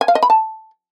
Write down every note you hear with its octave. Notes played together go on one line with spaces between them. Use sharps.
G#5
F5
D#5
B5
A5